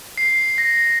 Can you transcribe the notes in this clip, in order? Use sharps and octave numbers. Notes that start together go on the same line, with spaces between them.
C7
A#6